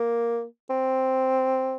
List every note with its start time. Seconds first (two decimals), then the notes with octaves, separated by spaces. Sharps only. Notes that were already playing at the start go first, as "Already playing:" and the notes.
Already playing: A#3
0.70 C4